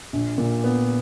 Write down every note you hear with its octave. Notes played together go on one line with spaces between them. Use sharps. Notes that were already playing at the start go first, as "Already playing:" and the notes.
A#1
A#2
B3